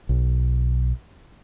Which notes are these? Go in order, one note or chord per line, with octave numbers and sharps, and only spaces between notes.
B1